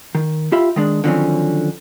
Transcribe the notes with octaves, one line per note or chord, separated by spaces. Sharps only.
D#3
F4 G4 E5 B5
D#3 G#3 D4
D3 D#3 F3 F#3 C4 C#4